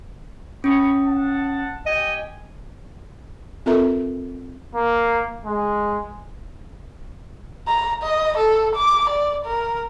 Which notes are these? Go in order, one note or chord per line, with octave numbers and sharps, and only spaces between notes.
C#4 B5 C#6 D#6
F#5 A5
G4 D#5 G5 G#5
C4 F4 A4 A#4 E5 A#5
A#3
G#3
A#5
D#5
A4
D6
D5
A#4